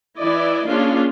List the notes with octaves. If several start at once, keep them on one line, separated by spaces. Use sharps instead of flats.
E3 E4 D5 D#5
A#3 C#4 D4 F4 G#4